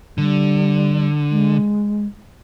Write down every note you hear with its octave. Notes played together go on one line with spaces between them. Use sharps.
D3 G3
G#3